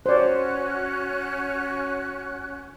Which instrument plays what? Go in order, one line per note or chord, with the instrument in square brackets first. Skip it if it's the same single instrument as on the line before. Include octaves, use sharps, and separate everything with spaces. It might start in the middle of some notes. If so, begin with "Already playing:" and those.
[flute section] C#4 F#4 F#6 [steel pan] C5 D5